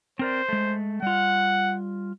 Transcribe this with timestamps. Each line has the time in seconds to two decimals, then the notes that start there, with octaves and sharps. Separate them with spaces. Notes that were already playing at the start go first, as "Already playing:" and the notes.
0.19 C4 A#4 C5 D5
0.49 G#3 A3
1.02 G3 F4 F#5